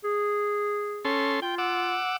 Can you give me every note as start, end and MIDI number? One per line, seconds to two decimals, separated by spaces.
0.04 1.09 68
1.05 1.40 61
1.05 1.40 69
1.05 1.40 84
1.42 1.99 65
1.42 1.55 79
1.58 2.17 78
1.58 2.17 86
1.58 2.17 88